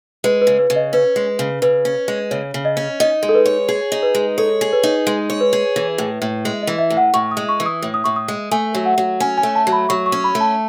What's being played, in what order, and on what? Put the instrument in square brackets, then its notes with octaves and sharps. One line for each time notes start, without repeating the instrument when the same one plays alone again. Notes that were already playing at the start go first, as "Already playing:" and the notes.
[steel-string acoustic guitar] G#3 [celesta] B4
[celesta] B4
[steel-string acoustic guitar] C#3
[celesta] B4
[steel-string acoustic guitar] C#3
[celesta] D#5
[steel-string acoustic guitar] C#4 [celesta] B4
[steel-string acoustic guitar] G#3
C#3
[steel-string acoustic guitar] C#3 [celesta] B4
[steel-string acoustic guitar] C#4
G#3
[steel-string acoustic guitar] C#3 [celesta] C#5
[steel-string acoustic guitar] C#3
[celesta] D#5
[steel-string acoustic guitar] C#4
[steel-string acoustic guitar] D#4 [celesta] D#5
[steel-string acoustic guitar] G#3
[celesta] A4
B4
[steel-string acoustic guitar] C#5
G#4
D#4
[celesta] B4
[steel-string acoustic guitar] G#3
[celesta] A4 [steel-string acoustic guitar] C#5
[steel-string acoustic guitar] G#4
[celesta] B4
[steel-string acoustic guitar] D#4
G#3
C#5
[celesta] B4
[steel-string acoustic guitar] G#4
E3
A2
A2
G#3
[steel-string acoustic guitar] E3 [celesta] D#5
[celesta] E5
[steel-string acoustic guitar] A2
[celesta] F#5
[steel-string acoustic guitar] A2 [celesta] C#6
[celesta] D#6
[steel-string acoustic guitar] G#3
[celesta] C#6
[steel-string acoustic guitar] E3
[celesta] D#6
[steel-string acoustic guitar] A2
[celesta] D#6
[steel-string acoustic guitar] A2 [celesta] C#6
[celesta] D#6
[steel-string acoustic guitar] G#3
[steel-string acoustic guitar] A3 [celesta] G#5
[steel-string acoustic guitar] F#3
[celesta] F#5
[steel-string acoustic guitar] F#3
[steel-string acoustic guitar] C#4 [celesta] G#5
[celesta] G#5
[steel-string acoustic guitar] A3
[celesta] A5
[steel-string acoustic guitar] F#3
[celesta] B5
[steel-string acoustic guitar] F#3 [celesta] C#6
[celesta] C#6
[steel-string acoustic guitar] C#4
[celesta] B5
[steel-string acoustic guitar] A3
[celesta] A5